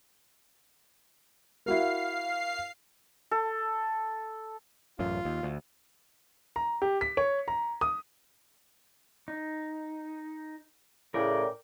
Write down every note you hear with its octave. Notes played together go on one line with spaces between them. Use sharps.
E4 F#4 A#4 F5 C7
A4
A1 F#2 F4
D#2
D2
A#5
G4
B6
C#5
A#5
D#6
D#4
A2 C#3 A#4 D5 G5